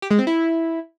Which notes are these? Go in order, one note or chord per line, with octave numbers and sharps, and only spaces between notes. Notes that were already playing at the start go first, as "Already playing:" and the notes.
G4
G#3
C4
E4